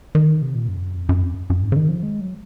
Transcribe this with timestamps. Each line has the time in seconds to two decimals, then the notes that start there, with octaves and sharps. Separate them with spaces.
0.15 D#3
0.42 C3
0.55 A#2
0.69 F#2
0.77 F2
0.82 F#2
0.96 F2
1.09 F#2
1.22 F2
1.50 F#2
1.62 G#2
1.72 C#3
1.76 D#3
1.89 F3
2.03 G#3
2.21 F#3